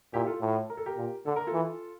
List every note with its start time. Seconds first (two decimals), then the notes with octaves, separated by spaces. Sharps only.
0.13 A#2 E4 G4
0.27 F4 A4
0.41 A2
0.70 A#4
0.77 A4
0.86 G4 A#4
0.97 A#2
1.26 D3 A4
1.36 A#4
1.47 F4 A4
1.53 E3